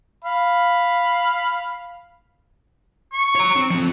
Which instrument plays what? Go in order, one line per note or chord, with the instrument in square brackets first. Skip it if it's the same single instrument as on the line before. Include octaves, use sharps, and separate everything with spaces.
[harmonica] F5 B5
[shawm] C#6
[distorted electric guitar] C#5 A#5
C4
F3 C4